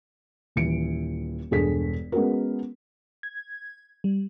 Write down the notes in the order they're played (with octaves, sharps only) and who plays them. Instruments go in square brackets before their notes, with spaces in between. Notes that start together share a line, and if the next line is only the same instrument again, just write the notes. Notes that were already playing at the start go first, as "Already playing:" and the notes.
[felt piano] D#1 E3 C#7 D7
E1 G2 G#4 A4 B6
G#3 B3 C#4 F#4 A#4
[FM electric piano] G#6
G3